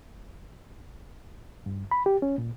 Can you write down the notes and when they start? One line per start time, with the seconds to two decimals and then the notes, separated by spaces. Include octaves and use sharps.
1.66 G2
1.91 B5
2.06 G4
2.22 C#4
2.38 A#2